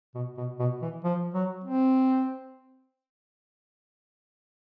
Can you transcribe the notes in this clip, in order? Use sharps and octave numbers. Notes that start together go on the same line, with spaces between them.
B2
B2
B2
E3
F3
F#3
C4